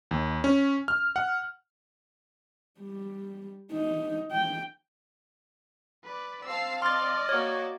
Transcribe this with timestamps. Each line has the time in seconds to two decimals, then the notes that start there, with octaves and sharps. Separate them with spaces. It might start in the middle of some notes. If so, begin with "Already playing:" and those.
0.11 D#2
0.44 C#4
0.88 F6
1.16 F#5
2.80 G3
3.73 D#4
4.31 G5
6.04 B4 D5
6.44 C4 F5 A5 E6 C7
6.82 D5 D#5 C6 F6 A6
7.29 A#3 F#4 C#5